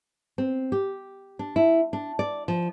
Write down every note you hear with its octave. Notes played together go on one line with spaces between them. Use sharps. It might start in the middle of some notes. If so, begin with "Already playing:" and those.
C4
G4
D4
E4
D4
D5
F3